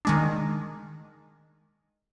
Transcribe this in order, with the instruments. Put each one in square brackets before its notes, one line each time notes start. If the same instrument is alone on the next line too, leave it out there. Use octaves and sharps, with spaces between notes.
[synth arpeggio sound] D#3 G#3 D4